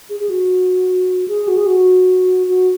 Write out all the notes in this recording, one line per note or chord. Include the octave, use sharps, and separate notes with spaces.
G#4
G#4
F#4
G#4
F#4
G#4
F#4
F#4